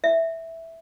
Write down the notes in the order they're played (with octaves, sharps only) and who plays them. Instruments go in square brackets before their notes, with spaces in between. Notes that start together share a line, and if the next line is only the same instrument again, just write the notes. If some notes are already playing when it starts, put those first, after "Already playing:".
[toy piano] E5